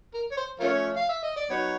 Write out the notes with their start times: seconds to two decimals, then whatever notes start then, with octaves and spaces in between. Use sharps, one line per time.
0.14 A#4
0.31 C#5
0.37 C5
0.59 F3 A3 C#4 F4 A#4 C#5
0.96 F5
1.09 E5
1.23 D#5
1.36 D5
1.49 F#3 B3 D#4 F#4 C#5